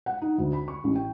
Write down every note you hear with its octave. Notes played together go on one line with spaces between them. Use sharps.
F#5
D#4
D2
B5
C#6
A1
G5